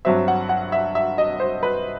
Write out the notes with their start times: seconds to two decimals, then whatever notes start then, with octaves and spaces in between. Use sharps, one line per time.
0.05 G2 F#3 C4 E5
0.28 F#5
0.49 F#5
0.72 E5
0.95 E5
1.18 D#5
1.40 C5
1.63 B4